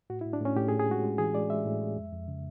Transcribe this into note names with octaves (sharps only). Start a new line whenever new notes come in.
A2 F#4
E4
A2
D4
A2 C#4
A2 G4
G#4
A2
G#4
G#3 F#4
G#3
E3 G#4
G#3 D5
G#3 E5
A2
G#3
F2
F2
C#3